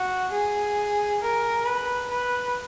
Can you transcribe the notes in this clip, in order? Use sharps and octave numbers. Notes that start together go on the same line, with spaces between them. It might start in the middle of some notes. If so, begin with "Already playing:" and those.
Already playing: F#4
G#4
A#4
B4
B4